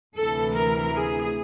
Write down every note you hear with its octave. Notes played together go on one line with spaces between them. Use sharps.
D2 C3 E3 A4
A#4
G#4